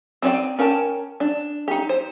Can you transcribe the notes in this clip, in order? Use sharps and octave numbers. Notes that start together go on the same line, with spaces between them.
C4 D#4 C#5 D5 G5
C#4 A#4 G5 A5
D4
D#4 G4
C5